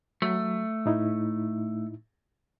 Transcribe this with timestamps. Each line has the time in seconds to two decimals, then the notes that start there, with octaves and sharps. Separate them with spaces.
0.22 F#3 A3
0.86 A2 D#4 E4